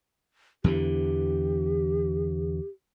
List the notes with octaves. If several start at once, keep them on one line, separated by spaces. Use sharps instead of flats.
E2 D3 E3 G4